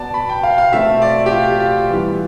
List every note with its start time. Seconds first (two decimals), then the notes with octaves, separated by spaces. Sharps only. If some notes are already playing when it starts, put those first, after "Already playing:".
Already playing: B2 B3 D5 A5
0.14 B5
0.29 G5
0.43 F5
0.58 F5
0.72 B2 A3 C4 E5
1.02 D5
1.26 G4
1.31 F4
1.60 F4
1.89 E3 G3 B3